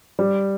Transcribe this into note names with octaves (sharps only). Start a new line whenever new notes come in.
G3